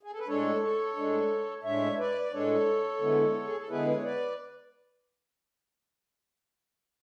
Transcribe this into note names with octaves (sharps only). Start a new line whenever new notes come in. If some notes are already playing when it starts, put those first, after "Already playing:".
G#4
A4
B4
A2 G#3 D4 A4 C#5
A4 C#5
A2 G#3 D4
A2 G#3 D4 C#5 E5
B4 D5
D5
A2 G#3 D4 A4 C#5
D3 G#3 B3 E4
G#4
A4
D3 G#3 B3 E4 G#4 B4
B4
C#5
B4 D5